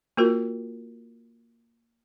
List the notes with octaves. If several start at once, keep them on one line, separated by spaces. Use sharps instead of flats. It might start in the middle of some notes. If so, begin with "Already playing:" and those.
A#3 F4 F#4 A#4